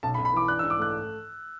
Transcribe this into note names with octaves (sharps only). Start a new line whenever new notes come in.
B1 A5
B5
B1
B5
E3 D6
D4 F#6
E6
G#2
D6
A3 F#6